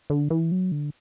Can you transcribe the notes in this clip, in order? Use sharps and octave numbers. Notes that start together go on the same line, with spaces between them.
D3
E3
F#3
D3